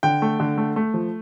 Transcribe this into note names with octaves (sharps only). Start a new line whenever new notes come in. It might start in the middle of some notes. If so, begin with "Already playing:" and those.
D3 G5
A3
D3
A3
A3
F3